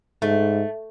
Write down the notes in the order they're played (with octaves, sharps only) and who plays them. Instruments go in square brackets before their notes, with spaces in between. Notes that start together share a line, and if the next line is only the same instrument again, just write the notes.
[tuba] G#2 [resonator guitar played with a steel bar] A3